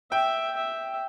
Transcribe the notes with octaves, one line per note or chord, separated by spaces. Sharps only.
E5 G5
E5